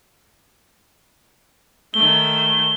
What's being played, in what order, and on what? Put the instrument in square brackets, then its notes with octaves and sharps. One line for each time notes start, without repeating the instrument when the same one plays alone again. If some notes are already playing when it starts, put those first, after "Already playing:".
[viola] D#3 A3 [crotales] G7